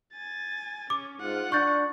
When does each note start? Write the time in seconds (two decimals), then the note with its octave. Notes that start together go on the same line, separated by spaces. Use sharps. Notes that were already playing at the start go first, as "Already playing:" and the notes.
0.13 G#5 A6
0.90 C#4 D6
1.20 G#2 F4 F#5
1.52 D4 C#6 G6 A6